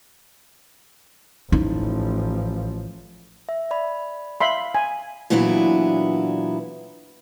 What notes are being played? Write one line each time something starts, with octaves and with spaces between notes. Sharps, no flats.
A1 F3 D#4 E4
E5
D5 B5
E5 F5 B5 C6
G#5
A#2 E3 F#3 B3 D4 E4